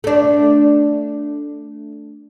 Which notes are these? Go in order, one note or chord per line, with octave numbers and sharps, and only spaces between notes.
A3 D4